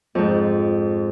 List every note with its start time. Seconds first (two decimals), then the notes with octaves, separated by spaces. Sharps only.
0.15 F2 G#2